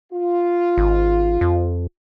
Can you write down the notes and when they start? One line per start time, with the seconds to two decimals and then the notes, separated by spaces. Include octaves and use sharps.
0.13 F4
0.78 G#1
1.41 F2